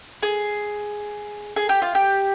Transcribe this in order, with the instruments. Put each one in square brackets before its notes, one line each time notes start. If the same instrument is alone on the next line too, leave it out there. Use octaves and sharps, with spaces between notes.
[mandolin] G#4
G#4
G4
F4
G4